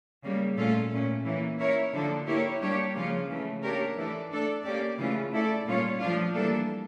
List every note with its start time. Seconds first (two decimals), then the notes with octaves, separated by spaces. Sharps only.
0.24 C#3 G3 A#3
0.58 A#2 A3 C#4 F4 A4
0.92 A#2 A3 C#4
1.25 E3 A#3 C#4
1.60 A#3 E4 A#4 C#5
1.93 D3 F3 A#3 D4 A4
2.27 A#3 E4 G4 A#4 C#5
2.61 G3 A#3 D4 G4 C#5
2.95 C#3 F3 A#3 C#4 F4
3.29 C#3 E3 A3
3.63 A#3 D4 G4 A#4 C#5
3.97 E3 A3 D4 A4 D5
4.31 A3 D4 A4 D5
4.64 A#3 C#4 G4 D5
4.98 C#3 E3 A3 C#4 F4
5.32 A3 E4 A4 D5
5.66 A#2 G3 C#4 F4 C#5
6.00 F3 A3 D4 F4
6.35 E3 G3 A#3 D4 A4